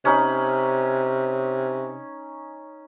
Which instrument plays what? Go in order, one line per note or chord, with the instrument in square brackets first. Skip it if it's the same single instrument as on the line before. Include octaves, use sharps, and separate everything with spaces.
[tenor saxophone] C3 [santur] C#4 D#4 B5